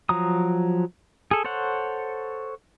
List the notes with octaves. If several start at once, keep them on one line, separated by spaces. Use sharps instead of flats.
F3 F#3 A#5 D#6
G#4 A4
A4 C5 C#5 F#5